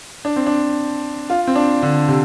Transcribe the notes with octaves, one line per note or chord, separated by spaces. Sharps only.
D4
C4
D4
F4
C4
D4
D3
C3